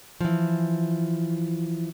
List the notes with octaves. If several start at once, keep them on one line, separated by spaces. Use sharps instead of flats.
E3 F3